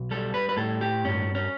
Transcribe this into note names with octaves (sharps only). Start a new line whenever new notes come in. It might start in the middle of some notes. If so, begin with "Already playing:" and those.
Already playing: B1
G3 A4
B4
B4
A2 A4
G4
G2 C#4
C#4